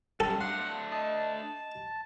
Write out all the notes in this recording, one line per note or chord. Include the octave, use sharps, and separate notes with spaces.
F#2 D3 F#3 G3 A4
A3 D4 F5 F#5 C6
D#5 A5